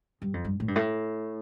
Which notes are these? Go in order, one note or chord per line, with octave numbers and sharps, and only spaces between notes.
G2
F2
G2
A2
G2
A2